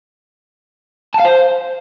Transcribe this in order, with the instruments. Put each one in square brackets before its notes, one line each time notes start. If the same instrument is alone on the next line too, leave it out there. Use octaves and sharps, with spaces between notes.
[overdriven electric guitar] A5
F5
C5